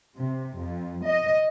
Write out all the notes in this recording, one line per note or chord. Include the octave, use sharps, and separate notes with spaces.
C3
F2
D#5